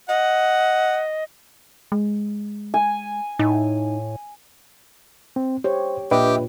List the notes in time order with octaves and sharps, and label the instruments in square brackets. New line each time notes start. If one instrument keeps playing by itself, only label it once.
[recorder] D#5 [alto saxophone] F#5
[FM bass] G#3
[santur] G#5
[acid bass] A2 [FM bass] D#4
[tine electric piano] C4
[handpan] G4 C#5 [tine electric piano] C5
[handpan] A#2 [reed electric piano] D4 B4 [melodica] G4 [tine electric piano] D#5 E5 G5